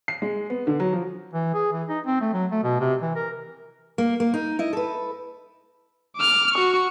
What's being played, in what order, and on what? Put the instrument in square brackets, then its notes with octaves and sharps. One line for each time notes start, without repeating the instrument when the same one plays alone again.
[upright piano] C7
G#3
B3
D3
F#3
F3
[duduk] E3
G#4
E3
D#4
C4
A3
F#3
A3
B2
C3
E3
A#4
[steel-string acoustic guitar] A#3
A#3
D#4
E4 D#5
A4 B4
[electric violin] D6 F6
F#4 C#6